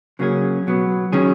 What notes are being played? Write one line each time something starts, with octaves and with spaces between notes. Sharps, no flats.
C#3 F#3 A#3 C#4 G#4
B2 F#3 B3
D#3 F#3 C#4 G#4